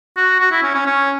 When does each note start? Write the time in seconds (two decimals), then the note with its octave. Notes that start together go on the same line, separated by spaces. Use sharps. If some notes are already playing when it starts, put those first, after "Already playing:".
0.17 F#4
0.40 F#4
0.51 E4
0.63 C#4
0.75 C#4
0.86 C#4